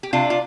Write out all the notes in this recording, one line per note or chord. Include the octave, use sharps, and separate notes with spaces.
G4
C3 D4 F4
F4